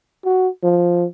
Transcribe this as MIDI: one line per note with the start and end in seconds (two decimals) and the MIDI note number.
0.25 0.48 66
0.63 1.05 53